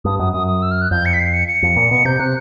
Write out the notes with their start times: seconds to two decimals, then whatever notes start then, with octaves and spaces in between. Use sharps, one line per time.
0.05 G2 D#6
0.19 F#2 D#6
0.33 F#2 D#6
0.47 D#6
0.62 E6
0.71 F6
0.82 F#6
0.91 F2 G6
1.06 C#7
1.14 B6
1.20 C7
1.33 C#7
1.48 C#7
1.62 F2
1.76 A#2
1.91 B2
2.05 C3 G6
2.19 C3 F#6